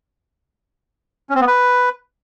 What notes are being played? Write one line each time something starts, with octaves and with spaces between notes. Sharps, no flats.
C#4
C4
B3
B4